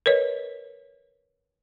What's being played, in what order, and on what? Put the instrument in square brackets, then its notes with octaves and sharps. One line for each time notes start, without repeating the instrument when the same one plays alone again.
[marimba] A#4 B4 C#5 D#5